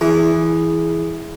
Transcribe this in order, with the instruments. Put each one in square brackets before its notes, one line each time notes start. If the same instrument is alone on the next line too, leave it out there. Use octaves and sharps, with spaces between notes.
[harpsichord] E3 [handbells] G#4